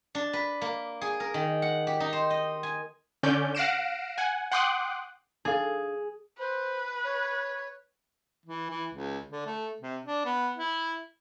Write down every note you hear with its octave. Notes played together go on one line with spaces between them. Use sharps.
D4
B4
A#3
G#4
A#4
D#3
F#5
G4
D#4
C5
D#5
G#5
D3 C#4 D5 G6
F5 F#5 A#6 C7 D7 E7
F#5 G#5
F#5 G5 C6 D6 D#6 F#6
D4 G#4 A4 F5
B4 C5
C#5
E3
E3
C#2
D3
A3
C3
D4
B3
E4